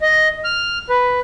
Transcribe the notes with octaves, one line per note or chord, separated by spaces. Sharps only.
D#5
F6
B4